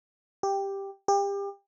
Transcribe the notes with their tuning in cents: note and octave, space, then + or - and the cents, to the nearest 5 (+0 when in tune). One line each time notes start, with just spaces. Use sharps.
G4 +5
G4 +30